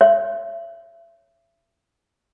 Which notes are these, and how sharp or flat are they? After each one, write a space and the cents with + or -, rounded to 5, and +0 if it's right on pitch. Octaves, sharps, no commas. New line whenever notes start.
C#5 +0 E5 +30